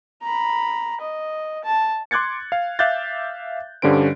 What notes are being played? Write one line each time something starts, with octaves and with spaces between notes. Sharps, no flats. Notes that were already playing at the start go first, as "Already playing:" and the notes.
A#5 B5
D#5
A5
C6 D6 F#6 G#6 A6 C#7
F5
E5 F5 D6 F#6 G6 A6
G2 D3 G3 C#4 C5 D7